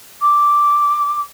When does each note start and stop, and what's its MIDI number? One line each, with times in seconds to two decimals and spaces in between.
0.21 1.20 86